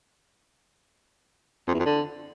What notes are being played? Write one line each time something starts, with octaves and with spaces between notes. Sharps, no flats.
F2
E2
F2
D3